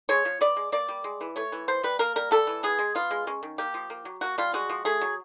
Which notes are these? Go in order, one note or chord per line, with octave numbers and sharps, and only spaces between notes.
G#3 C#5
F3
B3 D5
G#3
A#3 D5
G3
G#3
E3
A3 C#5
E3
B3 C5
G3 B4
A#3 A#4
G3 A#4
G3 A4
E3
B3 G#4
G#3
B3 F4
G#3
G#3 C#4
D#3
A#3 G4
F3
A#3
F#3
A#3 F#4
G3 F4
G#3 F#4
F3
A3 G#4
F#3